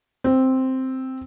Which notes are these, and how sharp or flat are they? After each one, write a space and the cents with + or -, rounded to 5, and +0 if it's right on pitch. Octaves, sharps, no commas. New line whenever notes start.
C4 +0